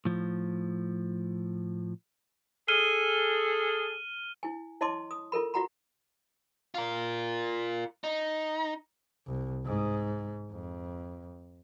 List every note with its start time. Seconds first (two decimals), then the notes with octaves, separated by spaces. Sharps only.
0.05 A2 F3
2.68 G#4 A4 F6 D#7 G7
4.43 E4 G#5
4.81 E4 C#5 D#5 A5 C6 D6
5.11 D#6
5.32 F4 A4 A#4 B5
5.54 F4 F#4 F#5 A#5 B5
6.75 F4 A#4
8.04 D#4
9.27 C2
9.65 G#2
10.52 F2